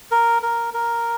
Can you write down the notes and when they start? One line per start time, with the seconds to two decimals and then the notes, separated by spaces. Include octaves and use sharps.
0.11 A#4
0.42 A#4
0.74 A#4